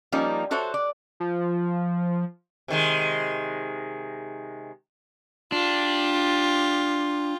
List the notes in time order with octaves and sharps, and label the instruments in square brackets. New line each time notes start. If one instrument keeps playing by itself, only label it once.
[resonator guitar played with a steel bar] F3 G3 A#3 C#4 D#4
F#4 A4 C5 C#5 E5
D5
[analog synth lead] F3
[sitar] C3 D#3 G#3
[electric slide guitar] D4 [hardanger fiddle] F4 G4